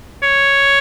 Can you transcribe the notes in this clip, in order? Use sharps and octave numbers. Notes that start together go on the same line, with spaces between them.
C#5